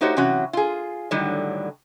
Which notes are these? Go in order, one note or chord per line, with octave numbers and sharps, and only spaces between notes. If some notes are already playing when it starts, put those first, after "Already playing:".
A3 D#4 F#4 G4 C5 C#5
C3 E3 F#3 C#4 F#4
F4 G#4
A2 D3 D#3 F#3 G3